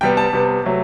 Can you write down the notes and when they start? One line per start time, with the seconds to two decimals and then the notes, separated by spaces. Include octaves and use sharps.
0.01 C3 G3 B3 G5
0.17 A5
0.33 C3 G3 B3
0.64 C3 F#3 A3